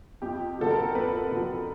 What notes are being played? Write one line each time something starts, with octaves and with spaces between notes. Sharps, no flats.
F2 G4
D3 F#3 A4
A#4
F2 B4
D3 F#3